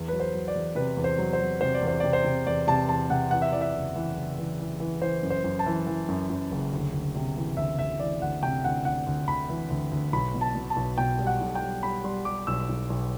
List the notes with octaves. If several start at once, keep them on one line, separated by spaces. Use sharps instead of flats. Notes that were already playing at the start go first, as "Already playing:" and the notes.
Already playing: E2
F#3 B4
C5
F#3
D5
E2
C3 B4
E2
C5
F#3
C5
F#3
C3 C5
D5
E2
C5
C3 D5
C5
C3
E2 D5
C3 A5
E2 A5
C3 F#5
E3 F#5
E5
E3 D5
E5
F#1
E3
F#1
E3
E3
E3
E3 C5
F#2
C5
F#2
A5
E3
E3
F#2
F#2
F#1
D2
D2
C3
E3
D2 E5
D2 E5
E3 D5
D2 F#5
C3 G5
D2 F#5
D2 F#5
D2
D2 B5
E3
D2
D2
B1 B5
B2
A5
B2
A5
B1
B2 G5
G3
F#5
B1
G5
G3
G3 B5
G3 C6
G3 D6
B1 E6
B1
B1